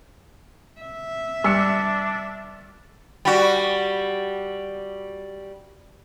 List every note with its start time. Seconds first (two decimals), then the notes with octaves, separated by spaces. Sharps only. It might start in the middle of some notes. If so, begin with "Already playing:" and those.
0.81 E5
1.44 G2 D4 E6 C#7
3.25 G3 F#4